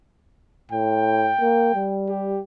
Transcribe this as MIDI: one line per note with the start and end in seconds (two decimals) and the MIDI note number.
0.71 1.32 45
0.71 2.03 79
1.40 1.75 58
1.75 2.40 55
2.09 2.40 67